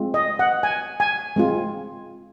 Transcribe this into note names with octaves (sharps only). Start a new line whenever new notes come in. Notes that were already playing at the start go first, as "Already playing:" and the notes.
Already playing: G#3 C4 F4
D#5
F#5
G#5
G#5
G#3 C4 F4